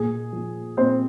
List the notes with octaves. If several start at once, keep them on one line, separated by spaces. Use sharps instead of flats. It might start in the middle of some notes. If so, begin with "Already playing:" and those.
Already playing: A#2 G#4
F3
A#2 C4 C5